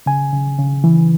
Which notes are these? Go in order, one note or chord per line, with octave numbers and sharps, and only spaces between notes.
C#3 G#5
C#3
C#3
E3